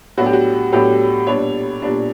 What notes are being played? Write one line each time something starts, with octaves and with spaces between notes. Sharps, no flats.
A2 F#3 B3 D4 F#4
G4
F#4
A2 F#3 B3 D4 G4
A#2 G3 B3 D4 C#5
A#2 G3 B3 D4